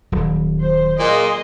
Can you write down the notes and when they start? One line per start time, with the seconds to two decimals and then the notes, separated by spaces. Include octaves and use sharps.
0.12 D#1 F#3
0.61 C5
0.99 A#2 G#4 D#5 C6